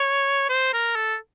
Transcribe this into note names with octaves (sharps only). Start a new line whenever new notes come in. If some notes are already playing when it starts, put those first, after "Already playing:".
Already playing: C#5
C5
A#4
A4